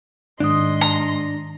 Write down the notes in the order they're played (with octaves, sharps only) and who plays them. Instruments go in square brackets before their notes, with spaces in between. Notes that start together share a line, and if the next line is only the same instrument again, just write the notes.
[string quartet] G#2 D#5 C6 [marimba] D#3 D#6 [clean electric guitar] D4
[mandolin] A#5